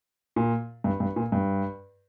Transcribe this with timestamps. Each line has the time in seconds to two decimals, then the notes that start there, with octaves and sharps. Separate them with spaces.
0.36 A#2
0.84 G2
1.00 G2
1.16 A#2
1.32 G2